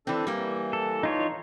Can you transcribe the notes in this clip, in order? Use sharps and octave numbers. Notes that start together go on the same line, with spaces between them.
E3 C4 D4 A4
E3 G3 A#3
A4
D#4 F4 C#5